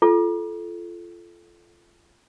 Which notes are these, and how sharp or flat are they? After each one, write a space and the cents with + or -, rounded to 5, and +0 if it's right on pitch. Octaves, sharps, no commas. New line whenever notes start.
F4 -25 A4 -20